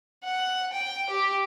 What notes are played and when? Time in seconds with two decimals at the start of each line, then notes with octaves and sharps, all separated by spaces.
0.25 F#5
0.73 G5
1.10 G4